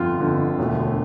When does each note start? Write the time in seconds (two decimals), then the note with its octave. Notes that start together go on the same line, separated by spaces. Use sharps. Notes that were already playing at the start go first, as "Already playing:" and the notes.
Already playing: G1 F2 D3 F4
0.20 G1 F2 D3
0.59 E1 D2 D3 A3